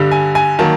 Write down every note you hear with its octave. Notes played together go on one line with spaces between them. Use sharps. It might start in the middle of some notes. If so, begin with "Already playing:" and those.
Already playing: G2 D3 G3
G#5
G#5
D#3 F#3 A#3 A5